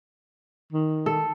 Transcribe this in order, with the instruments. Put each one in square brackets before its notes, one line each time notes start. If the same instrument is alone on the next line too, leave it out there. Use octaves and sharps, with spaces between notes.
[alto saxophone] D#3
[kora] A4